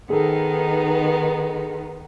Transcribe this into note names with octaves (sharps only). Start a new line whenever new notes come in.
D#3 B3 D#4 G#4 A4